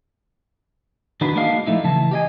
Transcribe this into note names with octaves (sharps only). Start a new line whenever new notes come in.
D#3 D4 F#4 A#4 B4
G#3 A#3 D4 D#4 F5
F3 A3 D#4 E4
C#3 E3 A5
G4 D#5 G#5